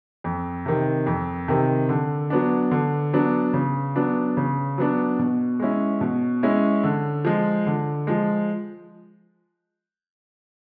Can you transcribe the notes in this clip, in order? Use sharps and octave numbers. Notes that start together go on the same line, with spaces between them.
F2
C3 D#3
F2
C3 D#3
D3
F#3 B3 D4
D3
F#3 B3 D4
C#3
F#3 B3 D4
C#3
F#3 B3 D4
B2
G#3 C#4 E4
B2
G#3 C#4 E4
D3
F3 G#3
D3
F3 G#3